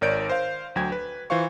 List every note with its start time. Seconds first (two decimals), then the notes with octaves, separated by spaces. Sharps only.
0.01 G#1 A#4 C#5 D5 G6 D7
0.30 C5 F5
0.76 D2 F#3 G5 G#6
0.92 B4
1.30 E3 F4 C5 F5 C#6